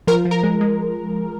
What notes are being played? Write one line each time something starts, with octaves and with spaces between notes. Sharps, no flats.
F3 A#4
F3
A#4
G#3
G#3